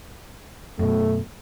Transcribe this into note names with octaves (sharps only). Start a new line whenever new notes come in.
F#2 B2 A3